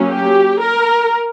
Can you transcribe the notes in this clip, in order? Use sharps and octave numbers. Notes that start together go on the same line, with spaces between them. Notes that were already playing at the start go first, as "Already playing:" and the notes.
Already playing: F#3 A#3 C#4
G4
A#4